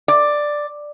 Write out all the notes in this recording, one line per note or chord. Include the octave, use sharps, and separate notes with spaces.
D5